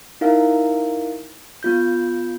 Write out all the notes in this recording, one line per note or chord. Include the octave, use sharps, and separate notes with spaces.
D#4 E4 A#4 F5
B3 F4 G6